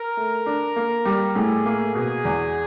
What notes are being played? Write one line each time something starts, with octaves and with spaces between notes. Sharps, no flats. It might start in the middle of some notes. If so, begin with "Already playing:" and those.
Already playing: A#4
A3
D4
A#3
G3
A2 G#4
A#3
B2 G#4
E2